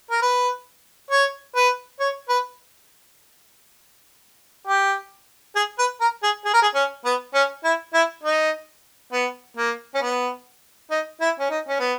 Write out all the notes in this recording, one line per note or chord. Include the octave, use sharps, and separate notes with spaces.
A#4
B4
C#5
B4
C#5
B4
G4
G#4
B4
A#4
G#4
G#4
A#4
G#4
C#4
B3
C#4
E4
E4
D#4
B3
A#3
C#4
B3
D#4
E4
C#4
D#4
C#4
B3